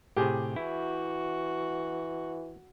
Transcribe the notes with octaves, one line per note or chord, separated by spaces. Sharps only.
A2 C3 G4 G#4
E3 E4 F#4